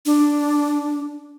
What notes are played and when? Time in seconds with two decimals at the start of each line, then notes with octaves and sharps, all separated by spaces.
0.06 D4